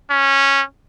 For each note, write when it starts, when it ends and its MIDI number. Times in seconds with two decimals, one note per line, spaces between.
0.10 0.62 61